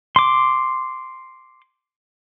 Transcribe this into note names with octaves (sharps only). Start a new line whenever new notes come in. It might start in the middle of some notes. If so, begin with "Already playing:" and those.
C6 D6